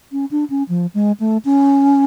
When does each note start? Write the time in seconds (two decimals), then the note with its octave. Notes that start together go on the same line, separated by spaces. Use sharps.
0.12 C#4
0.31 D4
0.50 C#4
0.69 F3
0.94 G#3
1.20 A3
1.45 C#4